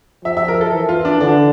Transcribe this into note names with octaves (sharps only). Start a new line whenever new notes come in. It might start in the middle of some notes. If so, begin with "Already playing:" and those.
F3 E5
E5
A#4
A4
E3
F4
D4
D3 D4